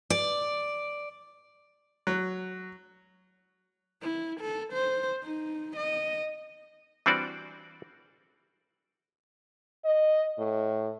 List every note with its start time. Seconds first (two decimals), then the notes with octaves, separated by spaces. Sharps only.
0.10 D5
2.07 F#3
4.02 E4
4.41 A4
4.73 C5
5.23 D#4
5.76 D#5
7.06 E3 G3 C4 D4 F#4 D5
9.85 D#5
10.39 A2